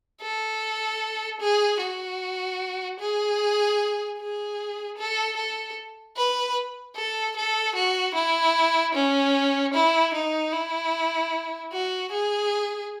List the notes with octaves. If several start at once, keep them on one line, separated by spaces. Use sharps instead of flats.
A4
G#4
F#4
G#4
G#4
A4
A4
B4
A4
A4
F#4
E4
C#4
E4
D#4
E4
F#4
G#4